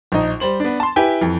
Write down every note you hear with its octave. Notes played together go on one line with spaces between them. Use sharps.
A#1 D#4
G3 C5 F#7
B3 D4
A5 C6
E4 G4 B4 G5 G#5
F2 E3